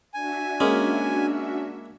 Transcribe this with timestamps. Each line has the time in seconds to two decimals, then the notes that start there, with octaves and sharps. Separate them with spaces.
0.14 D4 F#4 E5 G#5
0.60 G#3 A#3 C#4